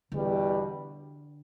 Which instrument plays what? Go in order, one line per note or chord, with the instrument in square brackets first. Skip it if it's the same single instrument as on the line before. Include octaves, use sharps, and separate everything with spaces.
[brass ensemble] E2 B2 G3 [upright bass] D3